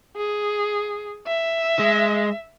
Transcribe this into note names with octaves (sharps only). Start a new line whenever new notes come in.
G#4
E5
G#3